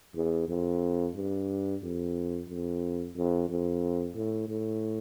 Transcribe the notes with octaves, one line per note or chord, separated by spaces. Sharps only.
E2
F2
G2
F2
F2
F2
F2
A2
A2